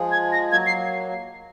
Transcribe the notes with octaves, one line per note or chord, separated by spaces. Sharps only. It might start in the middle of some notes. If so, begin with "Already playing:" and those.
Already playing: F3 G#3
G#6
A#6
F#3 A#3 G#6
C7